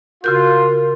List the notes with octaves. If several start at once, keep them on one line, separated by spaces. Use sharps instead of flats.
C#3 F4 F#4 A#4 G6